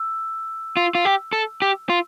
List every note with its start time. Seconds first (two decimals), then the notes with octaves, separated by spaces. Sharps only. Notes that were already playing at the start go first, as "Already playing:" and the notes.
Already playing: E6
0.77 F4
0.95 F4
1.05 G4
1.33 A4
1.62 G4
1.89 F4